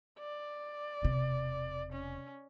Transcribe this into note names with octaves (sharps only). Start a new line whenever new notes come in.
D5
E1 C3
C#4